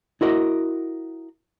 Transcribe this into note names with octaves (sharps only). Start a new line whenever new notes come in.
E4 F#4 A#4 D#5